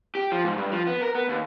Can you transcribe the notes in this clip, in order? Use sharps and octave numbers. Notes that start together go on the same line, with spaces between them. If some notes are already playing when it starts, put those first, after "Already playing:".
G4
F3
G#2
G2
F3
B3
A#4
B3
D#2